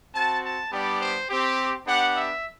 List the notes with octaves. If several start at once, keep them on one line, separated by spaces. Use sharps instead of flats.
C4 F#4 A5
A5
G3 B3 D4 G4 D5
C5
C4 G4
B3 D4 G4 F#5
E5